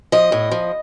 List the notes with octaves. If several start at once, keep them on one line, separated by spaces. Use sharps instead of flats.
F3 D#5
A2
F3